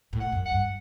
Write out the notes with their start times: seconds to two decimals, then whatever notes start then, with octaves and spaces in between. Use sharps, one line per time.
0.13 A2
0.20 F#5
0.32 F#2
0.45 F#5
0.51 G2